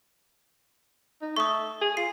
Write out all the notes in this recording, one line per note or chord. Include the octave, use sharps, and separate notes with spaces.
D#4
A3 C#6 D#6
G#4
F4 C7